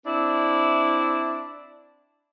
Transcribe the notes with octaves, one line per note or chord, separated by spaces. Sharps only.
C4 D4 E4